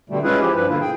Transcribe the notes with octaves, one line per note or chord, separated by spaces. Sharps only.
B2 D3 G3 A3
G#3 C#4 E4 F4 G#4 B4
F3 E4 G4
G2 F3 B4
B2 D3 A#3 E4 F4
G#4 G5